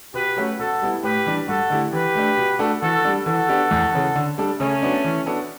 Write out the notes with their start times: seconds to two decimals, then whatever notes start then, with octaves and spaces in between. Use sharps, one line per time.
0.14 B2 G4 B4
0.37 F#3 A3 C#4 F#4
0.59 B2 F#4 A4
0.82 G3 B3 E4
1.03 A2 G4 B4
1.26 E3 G3 D4
1.48 G2 F#4 A4
1.70 D3 A3 E4 G4
1.93 E3 G4 B4
2.15 A3 D4
2.37 B2
2.59 A3 D4 F#4 A4
2.82 E3 F#4 A4
3.04 G3 D4
3.26 E3 F#4 A4
3.49 B3 D4 G4
3.71 E2
3.93 C#3 E3
4.16 D3
4.38 G3 D4 A4
4.60 C#3 A3 C#4
4.82 F#3 B3 D4
5.04 E3
5.26 B3 D4 F#4 A4